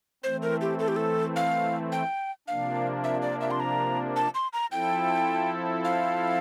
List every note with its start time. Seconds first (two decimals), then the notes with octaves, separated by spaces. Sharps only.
0.24 E3 A3 C4 C5
0.43 A#4
0.61 G4
0.79 A4
0.88 G4
0.96 A4
1.36 F5
1.92 G5
2.48 C3 F3 A#3 D4 F5
3.04 E5
3.22 D5
3.41 E5
3.51 C6
3.60 A#5
4.16 A5
4.35 C6
4.53 A#5
4.72 F3 C4 E4 A4 G5
5.84 F5